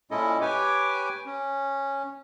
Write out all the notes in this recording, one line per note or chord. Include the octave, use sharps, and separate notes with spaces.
A#2 G#3 C#4 E4 A4 D#5
G4 B4 C#5 G5 G#5 D6
C#4